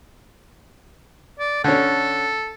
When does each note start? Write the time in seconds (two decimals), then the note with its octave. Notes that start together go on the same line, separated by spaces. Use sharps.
1.39 D5
1.64 D3 C#4 A4